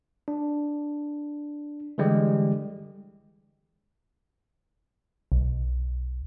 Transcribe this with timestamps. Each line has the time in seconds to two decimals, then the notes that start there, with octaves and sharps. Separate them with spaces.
0.28 D4
1.98 D3 E3 G3 G#3 G4
5.32 B1